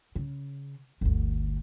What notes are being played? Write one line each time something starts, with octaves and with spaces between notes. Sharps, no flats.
C#3
G1 D2